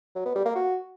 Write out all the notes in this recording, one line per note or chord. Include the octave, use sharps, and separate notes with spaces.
F#3
B3
G3
A#3
F#4